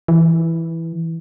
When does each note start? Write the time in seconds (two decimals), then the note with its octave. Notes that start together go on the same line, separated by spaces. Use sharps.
0.08 E3